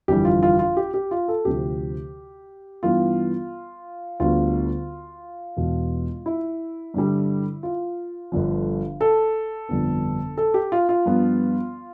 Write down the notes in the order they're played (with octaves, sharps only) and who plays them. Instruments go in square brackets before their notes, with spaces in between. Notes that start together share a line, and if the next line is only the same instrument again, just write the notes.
[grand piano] G1 F2 E3 G3 G4
F4
F4
F4
G4
G4
F4
A4
D2 C3 F3 C4 G4
G2 E3 B3 F4
D2 D3 G3 B3 F4
E1 E2 B2 B3
E4
G2 D3 G3
F4
G1 G2 D3 F3
A4
G1 F2 D3 G3 B3
A4
G4
F4
F4
G2 F3 B3